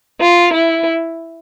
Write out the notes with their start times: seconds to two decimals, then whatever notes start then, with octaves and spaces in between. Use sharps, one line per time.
0.21 F4
0.53 E4